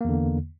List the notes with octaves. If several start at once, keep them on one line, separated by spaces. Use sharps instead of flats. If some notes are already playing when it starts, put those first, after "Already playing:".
E2 D3 A#3